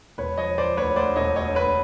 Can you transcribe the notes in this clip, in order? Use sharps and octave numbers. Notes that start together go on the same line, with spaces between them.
E1 B4 C#5
F3 C#5 D#5
F3 C5 D5
D2 B4 C#5
D2 C5 D5
E1 C#5 D#5
D2 C#5 D#5
D2 B4 C#5